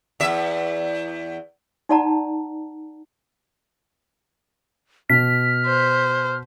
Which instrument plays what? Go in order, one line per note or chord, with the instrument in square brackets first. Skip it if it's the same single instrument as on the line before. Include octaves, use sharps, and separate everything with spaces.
[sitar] E2 E5
[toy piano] D#4 F#4 D5 F#5 A5 A#5
[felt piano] B2 [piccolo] F6 [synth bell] B6
[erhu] C5